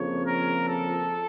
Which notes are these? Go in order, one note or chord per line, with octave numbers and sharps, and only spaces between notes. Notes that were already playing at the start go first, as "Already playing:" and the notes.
Already playing: F2 C#3 F3 A#3 C#5
A#4
A4